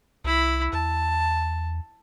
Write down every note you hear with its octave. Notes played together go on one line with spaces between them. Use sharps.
C2 E4 B5
E2 A5